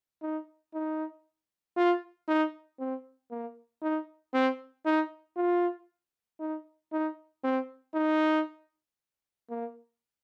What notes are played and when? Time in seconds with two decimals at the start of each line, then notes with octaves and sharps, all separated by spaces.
0.22 D#4
0.74 D#4
1.77 F4
2.28 D#4
2.79 C4
3.31 A#3
3.82 D#4
4.33 C4
4.85 D#4
5.36 F4
6.40 D#4
6.92 D#4
7.44 C4
7.95 D#4
9.50 A#3